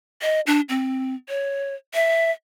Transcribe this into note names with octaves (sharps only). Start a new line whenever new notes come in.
D#5
D4
C4
C#5
E5